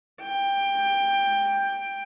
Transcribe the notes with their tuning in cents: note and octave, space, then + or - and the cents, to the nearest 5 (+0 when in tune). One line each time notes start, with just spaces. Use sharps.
G5 +15